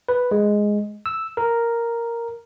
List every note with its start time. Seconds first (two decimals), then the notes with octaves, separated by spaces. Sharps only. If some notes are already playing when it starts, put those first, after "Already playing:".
0.09 B4
0.31 G#3
1.06 E6
1.37 A#4